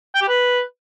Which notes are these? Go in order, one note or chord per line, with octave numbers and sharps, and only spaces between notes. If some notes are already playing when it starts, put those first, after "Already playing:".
G5
G4
B4